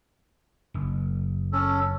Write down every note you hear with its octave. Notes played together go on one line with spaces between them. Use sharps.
F#1
C#4 A4